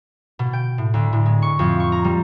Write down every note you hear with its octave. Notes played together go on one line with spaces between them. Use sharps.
B2
G5
A2
D2
A2
G#3
C#6
F2
C#6
A#5
G3